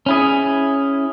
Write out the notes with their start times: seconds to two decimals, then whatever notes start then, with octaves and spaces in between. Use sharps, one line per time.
0.06 C#4 E4 G#4